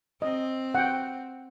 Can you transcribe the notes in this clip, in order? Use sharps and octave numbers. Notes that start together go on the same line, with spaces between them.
C4 D#5
F#5 G5